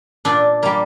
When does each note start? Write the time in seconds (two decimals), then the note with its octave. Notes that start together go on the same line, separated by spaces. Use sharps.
0.25 A#2 D4
0.63 G3 A#3